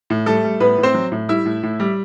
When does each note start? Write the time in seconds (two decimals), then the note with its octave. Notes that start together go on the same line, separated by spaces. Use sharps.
0.10 A2
0.26 G3 A3 A4
0.44 G3
0.60 A2 B3 B4
0.78 A2
0.83 C4 C5
0.94 F#3
1.12 A2
1.29 G3 E4 E5
1.45 A2
1.63 A2
1.80 G3